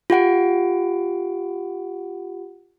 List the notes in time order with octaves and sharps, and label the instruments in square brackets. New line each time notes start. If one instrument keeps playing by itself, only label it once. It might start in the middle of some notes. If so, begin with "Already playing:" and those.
[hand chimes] F4 G4 F#5 D7